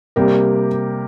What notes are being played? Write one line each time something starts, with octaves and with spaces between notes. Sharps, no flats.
C3 G3 A#3 G4 A#4